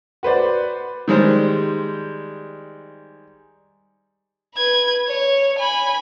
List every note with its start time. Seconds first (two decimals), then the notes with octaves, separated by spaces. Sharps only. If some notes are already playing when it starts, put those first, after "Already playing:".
0.23 F#4 B4 C5 D5
1.08 D#3 G3 G#3 C5
4.56 B4 G#6
5.08 C#5
5.58 G#5 B5